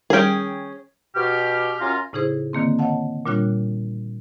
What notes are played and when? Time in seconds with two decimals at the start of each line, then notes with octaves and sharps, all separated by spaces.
0.10 D#3 G3 C#4 G#4 G5
1.15 B2 G4 F6
1.80 F#2 C#4 F4 F5 A#5
2.13 A2 C#3 D#4 E4 G#4 C5
2.53 D3 D#3 A#3 C4
2.79 C#5 D#5 F5 F#5 A5
3.26 A#2 G3 D4 F4 C#5 F#6